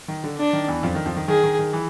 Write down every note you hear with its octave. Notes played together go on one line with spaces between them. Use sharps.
D#3
D3
D4
D#3
E2 E3
F2 F3
D#3
F2 F3
D#3
D#3 G#4
D#3
D#3
E3